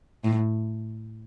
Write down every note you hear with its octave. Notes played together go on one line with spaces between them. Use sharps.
A2